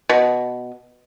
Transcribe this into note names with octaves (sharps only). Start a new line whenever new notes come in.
B2